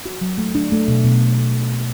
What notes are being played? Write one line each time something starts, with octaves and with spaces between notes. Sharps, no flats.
F#4
F#3
A3
D4
A3
B2
B2